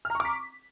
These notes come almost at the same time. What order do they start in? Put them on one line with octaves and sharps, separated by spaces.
F6 A#5 C#6 D6 B6